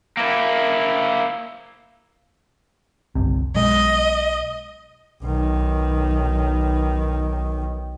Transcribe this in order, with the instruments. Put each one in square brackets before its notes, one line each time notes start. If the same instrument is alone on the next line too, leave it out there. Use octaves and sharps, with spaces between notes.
[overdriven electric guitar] A#3 E4
[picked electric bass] G1 C2 C3
[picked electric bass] B1 G#3 [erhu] D#5
[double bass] B1 D#3